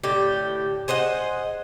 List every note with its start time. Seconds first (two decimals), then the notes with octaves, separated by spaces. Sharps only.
0.04 A2 D3 G4
0.88 G#4 C5 D#5 F#5